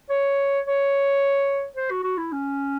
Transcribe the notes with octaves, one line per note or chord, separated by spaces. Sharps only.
C#5
C#5
C5
F#4
F#4
E4
C#4